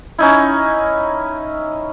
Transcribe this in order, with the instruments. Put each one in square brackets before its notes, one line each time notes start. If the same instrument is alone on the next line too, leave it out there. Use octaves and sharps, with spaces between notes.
[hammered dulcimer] C#4 D#4 E4